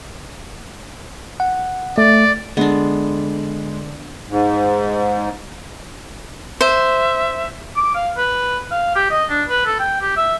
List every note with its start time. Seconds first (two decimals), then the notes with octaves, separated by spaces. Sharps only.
1.40 F#5
1.98 A3 D5
2.57 D3 G#3 B3 D4
4.29 G#2
6.61 C5 E5
7.76 D6
7.95 F5
8.17 B4
8.71 F5
8.95 G4
9.10 D#5
9.29 D4
9.48 B4
9.66 A4
9.79 G5
10.01 G4
10.17 E5